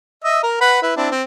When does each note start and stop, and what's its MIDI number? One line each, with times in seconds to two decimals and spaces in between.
0.24 0.40 75
0.24 0.40 76
0.24 0.40 88
0.43 0.57 70
0.43 0.57 82
0.61 0.81 71
0.61 0.81 78
0.61 0.81 83
0.82 0.96 64
0.82 0.96 71
0.96 1.09 60
0.96 1.09 62
0.96 1.09 64
1.11 1.23 60